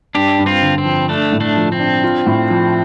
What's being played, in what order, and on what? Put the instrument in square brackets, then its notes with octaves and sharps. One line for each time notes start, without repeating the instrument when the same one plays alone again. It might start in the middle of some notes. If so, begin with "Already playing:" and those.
[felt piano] G2 [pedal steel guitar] D4 G4
[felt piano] G2
[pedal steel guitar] C4 F4
[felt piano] D3
[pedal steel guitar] C4
[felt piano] F3
[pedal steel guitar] A3 D4 [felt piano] A4
[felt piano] A2
[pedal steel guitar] A3 D4
[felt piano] F3
[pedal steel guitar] C4
[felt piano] D4
F4
A2
F3